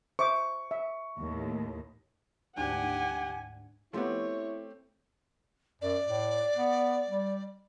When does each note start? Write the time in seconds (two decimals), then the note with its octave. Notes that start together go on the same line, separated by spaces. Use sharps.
0.19 C5 E5 C#6 D6
0.71 E5
1.18 D#2 A2
2.57 D2 G#2 D4 G4 F#5 G#5
3.93 F3 A3 B3 C4 E4 G4 C#5
5.82 F#2 D5
6.06 A2
6.56 B3
7.08 G3